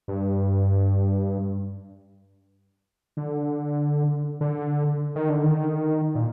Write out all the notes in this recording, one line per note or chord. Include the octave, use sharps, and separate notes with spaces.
G2
D3
D3
D#3
D3
D#3
A#2